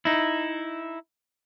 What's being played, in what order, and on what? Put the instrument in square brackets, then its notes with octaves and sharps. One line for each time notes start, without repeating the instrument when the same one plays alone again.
[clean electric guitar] D#4 E4